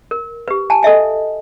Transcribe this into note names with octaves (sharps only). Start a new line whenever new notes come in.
A#4
G4 B4
G#5 A5
A4 D#5 E5 G#5